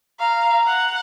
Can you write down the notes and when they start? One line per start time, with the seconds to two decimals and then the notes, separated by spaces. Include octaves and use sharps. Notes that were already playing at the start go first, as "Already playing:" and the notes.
0.19 F5 A#5
0.66 F#5